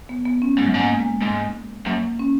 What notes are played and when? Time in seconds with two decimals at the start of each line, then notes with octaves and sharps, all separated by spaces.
0.09 B3
0.25 B3
0.42 C#4
0.57 G#2 B3
0.66 F#2
0.74 G#2
0.80 A#3
1.00 G#3
1.22 G#2
1.86 F#2 A#3
2.19 C#4